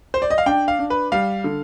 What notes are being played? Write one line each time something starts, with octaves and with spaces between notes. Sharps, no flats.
C5
D5
D#5
F5
D4 G5
F5
D4
B4
G3 F5
D3